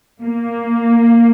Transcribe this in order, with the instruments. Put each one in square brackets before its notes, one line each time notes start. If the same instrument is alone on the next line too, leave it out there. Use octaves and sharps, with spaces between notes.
[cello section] A#3